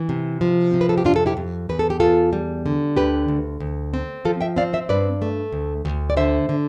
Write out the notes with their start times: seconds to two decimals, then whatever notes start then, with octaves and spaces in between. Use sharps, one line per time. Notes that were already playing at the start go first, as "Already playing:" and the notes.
Already playing: E3
0.09 C3
0.41 F3
0.74 C3
0.81 B4
0.89 A4
0.98 G4
1.04 F2 D4 F4
1.16 A4
1.26 E4 G4
1.37 F2
1.69 E2 B4
1.79 A4
1.90 G4
2.00 E2 F4 A4
2.33 G3
2.66 D3
2.97 D2 G4 B4
3.28 D2
3.60 D2
3.94 C4
4.25 F3 F4 A4
4.41 E5 G5
4.56 C4 D5 F5
4.73 C5 E5
4.89 G2 B4 D5
5.22 A3
5.52 D2
5.85 D2
6.10 D5
6.17 D3 C5 E5
6.49 D3